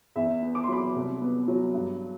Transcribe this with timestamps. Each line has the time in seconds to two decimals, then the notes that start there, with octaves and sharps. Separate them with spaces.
0.16 E2 E5
0.42 B3
0.55 D6
0.64 C6
0.68 F#3 B5 D6
0.95 C2
1.21 B3
1.48 F#3
1.74 G2